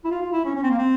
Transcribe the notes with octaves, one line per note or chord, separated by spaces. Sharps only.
E4
F4
F4
E4
C#4
C#4
C4
A#3
C4